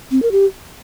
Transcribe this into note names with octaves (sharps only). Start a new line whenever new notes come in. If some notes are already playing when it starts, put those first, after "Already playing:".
C4
A#4
G4